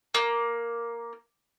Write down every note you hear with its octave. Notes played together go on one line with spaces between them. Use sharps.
A#3